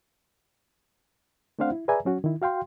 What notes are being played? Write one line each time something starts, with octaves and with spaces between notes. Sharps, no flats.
A3 C4 D4 C5 F5 F#5
E4
G#4 B4 D5 E5 G#5 A#5
F#3 C#4 F#4
D#3 E4
F#4 F5 G5 C6